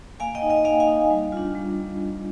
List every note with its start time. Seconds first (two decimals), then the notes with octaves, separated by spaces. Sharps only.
0.20 A#3 F5 G#5
0.35 D#5 G5
0.42 D#4
0.50 D#5 G5
0.65 A#3 F5 G#5
0.80 F5 G#5
0.88 D#4
1.11 G3
1.32 D4 F4
1.55 G3